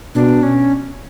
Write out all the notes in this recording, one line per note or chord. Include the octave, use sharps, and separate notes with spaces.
B2 D4
C#4